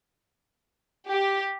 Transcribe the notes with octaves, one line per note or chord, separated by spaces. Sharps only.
G4